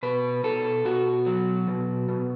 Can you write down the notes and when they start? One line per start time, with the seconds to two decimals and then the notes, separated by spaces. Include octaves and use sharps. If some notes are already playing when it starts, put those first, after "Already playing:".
0.03 B2 B4
0.44 B2 A4
0.85 B2 F#4
1.26 F#3
1.68 B2
2.09 B2